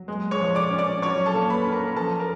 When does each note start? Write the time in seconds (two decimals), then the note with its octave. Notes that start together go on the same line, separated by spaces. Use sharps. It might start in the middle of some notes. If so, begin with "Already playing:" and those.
Already playing: F#3
0.08 G#3
0.31 C#5 C#6
0.40 F3
0.55 D5 D6
0.71 C#4
0.78 D5 D6
1.02 F#3 C#5 C#6
1.26 A4 A5
1.34 A#3
1.50 B4 B5
1.65 C#4
1.72 A#4 A#5
1.96 F3 A4 A5
2.20 A#4